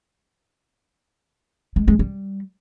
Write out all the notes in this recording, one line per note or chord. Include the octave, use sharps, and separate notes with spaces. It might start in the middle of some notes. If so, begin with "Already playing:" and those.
G#3
G#3
G3